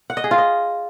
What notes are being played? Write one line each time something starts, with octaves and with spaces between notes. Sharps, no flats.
F#5
D#5
G#4
F4
D#5